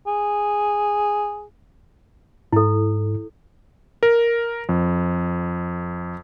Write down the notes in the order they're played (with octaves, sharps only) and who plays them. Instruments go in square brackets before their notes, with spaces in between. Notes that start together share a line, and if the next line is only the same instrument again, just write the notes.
[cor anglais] G#4
[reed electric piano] G#2 [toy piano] E4 A4
[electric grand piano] A#4
F2